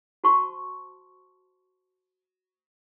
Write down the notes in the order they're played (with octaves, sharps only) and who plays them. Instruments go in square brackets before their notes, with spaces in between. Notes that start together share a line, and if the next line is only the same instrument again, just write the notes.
[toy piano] F#4 C5 A5 C6 C#6